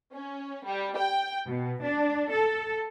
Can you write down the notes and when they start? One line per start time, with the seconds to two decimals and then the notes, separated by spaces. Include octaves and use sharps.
0.14 C#4
0.65 G3
0.97 G5
1.48 B2
1.83 D4
2.32 A4